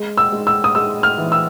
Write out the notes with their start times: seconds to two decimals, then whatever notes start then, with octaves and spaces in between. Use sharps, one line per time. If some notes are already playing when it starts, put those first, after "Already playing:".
Already playing: G#3
0.18 E6
0.32 G#3
0.47 E6
0.64 D#6
0.75 G#3 E6
1.03 F6
1.18 E3
1.32 E6